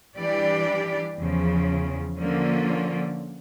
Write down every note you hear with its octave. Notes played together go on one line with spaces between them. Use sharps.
E3 G3 D4 G4 D5
E2 C#3 F3
D3 F3 A#3 C#4 F4